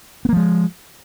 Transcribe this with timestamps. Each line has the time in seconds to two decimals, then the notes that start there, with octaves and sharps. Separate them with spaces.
0.25 B3
0.29 A#3
0.33 F3
0.36 G#3